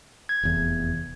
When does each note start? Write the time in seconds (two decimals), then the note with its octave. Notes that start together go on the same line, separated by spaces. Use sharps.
0.29 G#6
0.43 F1 E2